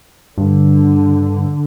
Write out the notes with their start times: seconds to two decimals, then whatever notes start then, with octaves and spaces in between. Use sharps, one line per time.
0.38 G2 D3